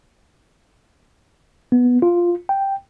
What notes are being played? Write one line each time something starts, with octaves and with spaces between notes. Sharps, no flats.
B3
F4
G5